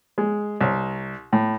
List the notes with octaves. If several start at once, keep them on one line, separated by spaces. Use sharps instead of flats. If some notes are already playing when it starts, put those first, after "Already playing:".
G#3
C2
A2